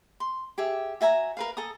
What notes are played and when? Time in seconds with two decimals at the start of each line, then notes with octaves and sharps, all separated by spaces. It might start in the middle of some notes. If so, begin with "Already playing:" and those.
0.20 C6
0.58 G4 G#4 E5
1.01 F#4 E5 G#5 A#5
1.37 A#4 B4 F5
1.57 A4 G#5 A#5 D#6